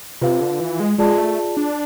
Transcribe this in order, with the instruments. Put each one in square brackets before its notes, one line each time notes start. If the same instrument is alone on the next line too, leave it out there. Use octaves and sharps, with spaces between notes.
[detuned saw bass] C3 [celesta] F4 B4 F5
[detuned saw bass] D3
E3
G#3
[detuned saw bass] G#3 [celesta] F4 G#4 D5 A5
[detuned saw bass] A3
D4